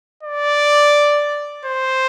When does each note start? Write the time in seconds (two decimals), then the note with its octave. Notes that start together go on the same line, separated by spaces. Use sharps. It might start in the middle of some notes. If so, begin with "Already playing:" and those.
0.23 D5
1.65 C5